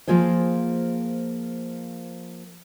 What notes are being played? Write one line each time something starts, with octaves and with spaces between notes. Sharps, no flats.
F3 A#3 F4 G#4 C5